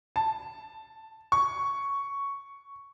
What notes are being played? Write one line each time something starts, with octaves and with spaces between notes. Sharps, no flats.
A5
C#6